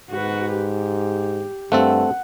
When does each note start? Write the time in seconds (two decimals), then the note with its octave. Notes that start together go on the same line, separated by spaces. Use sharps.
0.11 G#2 F#4 B4
0.55 G4
1.72 G2 A3 C4 A4 F#5